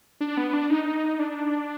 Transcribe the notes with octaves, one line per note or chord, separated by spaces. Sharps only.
D4
B3
B3
D4
D#4
D4